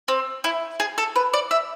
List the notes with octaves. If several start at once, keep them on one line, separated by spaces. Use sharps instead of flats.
C4
E4
G#4
A4
B4
D5
E5